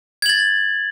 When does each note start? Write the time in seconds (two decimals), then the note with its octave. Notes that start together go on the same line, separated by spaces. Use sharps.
0.22 G#6
0.26 F#7
0.29 A6